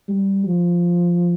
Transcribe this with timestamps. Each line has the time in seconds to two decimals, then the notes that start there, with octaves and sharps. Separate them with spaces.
0.08 G3
0.46 F3